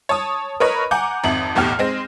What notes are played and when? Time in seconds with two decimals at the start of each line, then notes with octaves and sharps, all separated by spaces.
0.09 C#5 A5 D#6
0.60 A#4 B4 C#5 D#5 B5
0.91 F#5 G#5 A#5 D6 G6
1.24 G#1 F2 E5 F#7
1.55 B1 E2 A2 G4 F6
1.79 G#3 C4 A#6